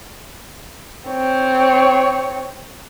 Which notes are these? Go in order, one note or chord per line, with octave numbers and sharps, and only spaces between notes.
C4 C#5